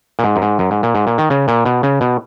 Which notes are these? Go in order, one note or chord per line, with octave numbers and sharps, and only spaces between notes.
A#2
G#2
F#2
G#2
F#2
G#2
A#2
G#2
A#2
D#3
C#3
A#2
B2
C#3
B2